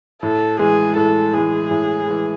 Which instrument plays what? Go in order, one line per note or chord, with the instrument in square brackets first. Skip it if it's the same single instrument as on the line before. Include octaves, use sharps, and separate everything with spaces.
[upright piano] A2 [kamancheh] A4
[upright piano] E3 G#3 [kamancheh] G#4
[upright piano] A2 [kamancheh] A4
[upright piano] E3 G#3 [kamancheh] G#4
[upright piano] A2
E3 G#3